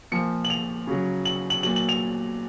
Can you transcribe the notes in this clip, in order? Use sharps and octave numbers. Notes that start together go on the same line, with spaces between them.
A#2 F3 C#7
F#7
F7
C#3 F#3
F#7
F#7
A#2 F#3 F#7
F#7
F7